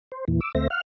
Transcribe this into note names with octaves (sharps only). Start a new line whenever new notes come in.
C5
E2 A#2 E3
D6 E6
D2 A3 C4 C5 E5 A#6
F5 F#5 F6